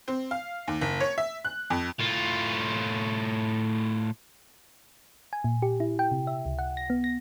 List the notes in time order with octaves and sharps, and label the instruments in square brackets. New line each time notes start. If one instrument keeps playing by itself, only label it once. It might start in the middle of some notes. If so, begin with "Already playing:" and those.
[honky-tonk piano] C4
F5
D#2
F#1
C#5
E5
F#6
F2
[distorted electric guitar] A2 F4
[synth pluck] G#5
A#2
G4
E4
G5
C3
E5
C#2
F#5
A#6
B3
A#6